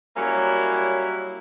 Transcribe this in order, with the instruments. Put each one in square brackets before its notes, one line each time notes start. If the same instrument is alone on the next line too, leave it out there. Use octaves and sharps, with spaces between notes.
[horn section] F#3 G3 A#3 C#4 E4